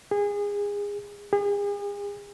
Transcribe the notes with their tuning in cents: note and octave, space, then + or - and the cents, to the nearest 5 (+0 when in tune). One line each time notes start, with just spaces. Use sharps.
G#4 -25
G#4 -40